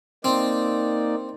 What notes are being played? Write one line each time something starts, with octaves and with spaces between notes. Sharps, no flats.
A#3 C4 D#4 D5